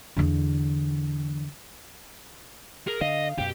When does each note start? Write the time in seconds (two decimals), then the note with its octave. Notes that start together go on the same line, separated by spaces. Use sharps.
0.17 E2 D3
2.88 G#4 A#4
3.01 D3 D#5 F5
3.38 F#2 B2 G4